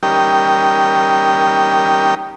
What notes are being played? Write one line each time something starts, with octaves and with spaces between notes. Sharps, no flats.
G3 C#4 D#4 G4 A#4 G5